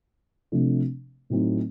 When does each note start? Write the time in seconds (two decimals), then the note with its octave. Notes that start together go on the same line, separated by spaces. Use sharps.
0.52 C3 F3 A3 D4
1.30 A2 F#3 A3 C4 D#4